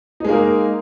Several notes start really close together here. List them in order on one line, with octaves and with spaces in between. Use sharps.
D#4 G#3 A#3 A#4